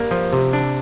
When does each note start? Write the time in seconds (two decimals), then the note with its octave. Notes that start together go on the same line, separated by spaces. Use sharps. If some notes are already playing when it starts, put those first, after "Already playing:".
Already playing: G2 A#3
0.11 F3
0.33 C3
0.53 D4